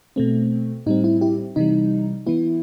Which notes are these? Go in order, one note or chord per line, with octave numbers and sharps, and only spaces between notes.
B2 A3 C4
A2 G3 C4 D#4
E4
E4 G4
C3 E3 G3 D#4
E3 B3 E4